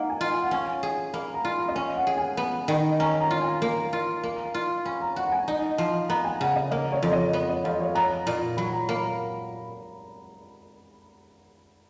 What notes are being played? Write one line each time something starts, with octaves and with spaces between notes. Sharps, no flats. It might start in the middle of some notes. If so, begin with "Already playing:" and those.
Already playing: A#3 D#4 F#5
G#5
F4
G#5
F#5
C#4 G#5
G#4
A#3 B5
A#5
F4
D#5
C#4 F5
F#5
G#4
G#5
B3
D#3
C#4 A#5
A#5
F4
G#5
A#3
F4
A#3
F4
C#4 B5
A#5
F#4 F#5
F#5
G#5
D#4
F3
B3 A#5
G#5
C#3 F#5
D#5
A#3 D#5
C#5
F2
D#5
B3 C#5
D#5
F2 F5
C#5
B3 A#5
A#2
F#3 B5
A#5
A#3 B5
A#5